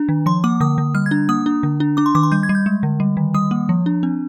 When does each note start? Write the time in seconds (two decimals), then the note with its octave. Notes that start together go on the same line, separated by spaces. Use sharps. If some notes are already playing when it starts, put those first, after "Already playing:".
Already playing: D4
0.09 D#3
0.26 F3 C6
0.44 A#3 D6
0.60 D3 D#6
0.78 D3
0.95 G3 F6
1.06 G#6
1.11 D4
1.29 A#3 D#6
1.46 D4
1.63 D3
1.80 D4
1.97 D4 D6
2.06 C6
2.15 D#3 D6
2.23 C6
2.32 G3 G6
2.43 G#6
2.49 G3
2.55 G6
2.66 G#3
2.83 D3
3.00 G3
3.17 D#3
3.34 G3 D#6
3.51 A#3
3.69 F3
3.86 D4
4.03 C4